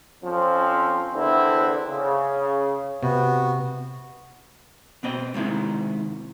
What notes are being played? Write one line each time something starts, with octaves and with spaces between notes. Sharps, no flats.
F2 F3 C4 C#4
E2 D3 C4 E4
C#3
C3 B3 F#4
B2 C4 D#5
G#2 C3 D#3 E4